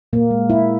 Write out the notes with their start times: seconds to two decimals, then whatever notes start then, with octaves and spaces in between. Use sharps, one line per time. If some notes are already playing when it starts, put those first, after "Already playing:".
0.13 A#2 A#3
0.31 G#3
0.50 G#3 E4